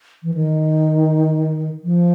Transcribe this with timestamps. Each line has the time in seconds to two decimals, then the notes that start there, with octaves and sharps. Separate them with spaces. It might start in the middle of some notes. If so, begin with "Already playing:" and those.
0.23 E3
0.34 D#3
1.84 F3